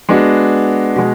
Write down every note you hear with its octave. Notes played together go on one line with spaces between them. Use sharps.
G#3 B3 D4 F#4
B2 G#3